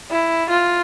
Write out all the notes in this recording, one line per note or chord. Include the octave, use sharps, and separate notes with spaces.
E4
F4